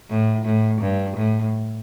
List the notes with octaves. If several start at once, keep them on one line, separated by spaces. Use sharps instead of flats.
A2
A2
G2
A2